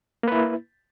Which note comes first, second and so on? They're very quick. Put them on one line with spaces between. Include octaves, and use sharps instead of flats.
A#3 B4 E4